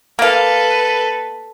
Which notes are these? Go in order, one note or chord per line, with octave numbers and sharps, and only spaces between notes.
A#3 A4 B4 F5